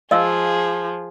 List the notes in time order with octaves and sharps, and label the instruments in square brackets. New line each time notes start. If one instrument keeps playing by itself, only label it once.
[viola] F3 [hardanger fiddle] G#4 [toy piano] D#5 F5 E6